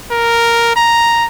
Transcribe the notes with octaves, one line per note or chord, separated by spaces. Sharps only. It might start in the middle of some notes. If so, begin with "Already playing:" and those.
A#4
A#5